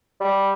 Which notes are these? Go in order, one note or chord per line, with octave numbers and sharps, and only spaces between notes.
G3